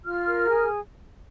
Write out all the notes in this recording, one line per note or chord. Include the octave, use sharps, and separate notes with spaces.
F4 F6
A#4
G#4